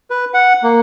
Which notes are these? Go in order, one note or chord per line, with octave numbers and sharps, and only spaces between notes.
B4
F#5
A#3